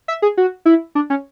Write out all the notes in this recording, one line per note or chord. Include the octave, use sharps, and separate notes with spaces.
E5
G#4
F#4
E4
D4
C#4